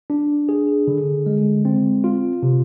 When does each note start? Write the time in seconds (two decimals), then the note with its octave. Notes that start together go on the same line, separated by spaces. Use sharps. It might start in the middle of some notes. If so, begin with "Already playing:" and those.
0.10 D4
0.49 G#4
0.88 D3
1.26 G#3
1.65 C4
2.04 F4
2.43 C3